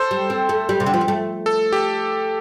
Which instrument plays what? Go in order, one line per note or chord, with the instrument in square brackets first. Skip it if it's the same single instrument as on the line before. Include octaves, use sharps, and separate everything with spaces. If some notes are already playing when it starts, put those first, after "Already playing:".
Already playing: [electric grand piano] A4 C5
[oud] G3
C4
A3
G3
C3
D3
F3
G3
A3
[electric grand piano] A4
G4